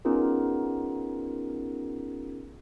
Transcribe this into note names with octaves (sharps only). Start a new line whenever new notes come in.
B3 C#4 D#4 F4 G#4 A#4